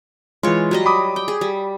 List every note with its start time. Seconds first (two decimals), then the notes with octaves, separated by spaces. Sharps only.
0.43 E3 G#3 F4 C#5
0.71 F#3 G3 D#5
0.86 B5 D6 D#6
1.16 G5
1.28 G#4
1.41 G3